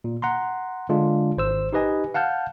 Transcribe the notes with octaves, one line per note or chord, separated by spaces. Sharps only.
A#2
F#5 A#5 C6
D3 G#3 D4 F4
G#1 C5 E6
D#4 G4 B4 D#5 G#5
F5 F#5 A5 F6 G6